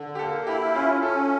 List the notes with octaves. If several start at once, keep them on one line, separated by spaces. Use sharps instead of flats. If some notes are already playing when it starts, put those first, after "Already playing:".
Already playing: D3
G4
A#3 A4
E4 G4
C#4 F4
C#4 A4